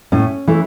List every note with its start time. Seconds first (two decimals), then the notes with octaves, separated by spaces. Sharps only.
0.12 A2 C#4
0.47 E3 A3